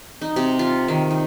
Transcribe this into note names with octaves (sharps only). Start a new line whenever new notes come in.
D#4
C3
F4
D#3
D#4